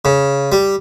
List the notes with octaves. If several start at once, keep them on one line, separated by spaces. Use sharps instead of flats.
C#3
G3